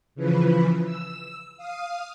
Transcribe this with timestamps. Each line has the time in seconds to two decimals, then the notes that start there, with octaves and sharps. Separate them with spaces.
0.15 C#3 E3 F3 B4
0.84 E6
1.57 F5 D#6